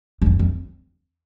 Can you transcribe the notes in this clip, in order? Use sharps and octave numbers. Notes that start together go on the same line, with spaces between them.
G2
F2
F2